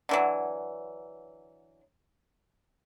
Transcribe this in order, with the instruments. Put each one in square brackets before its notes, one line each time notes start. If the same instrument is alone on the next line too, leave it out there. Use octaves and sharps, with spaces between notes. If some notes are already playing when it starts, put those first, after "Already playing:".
[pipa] D3 E3 F#3